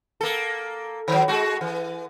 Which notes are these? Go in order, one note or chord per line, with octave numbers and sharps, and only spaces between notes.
A#3 A4
D#3 F#3
G#3 F#4
E3